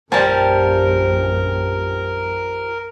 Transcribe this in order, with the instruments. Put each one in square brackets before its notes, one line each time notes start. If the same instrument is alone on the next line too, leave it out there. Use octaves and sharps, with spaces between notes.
[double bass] A#1 F#2 [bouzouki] F3 G3 [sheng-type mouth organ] A#4 [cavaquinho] G#5 A5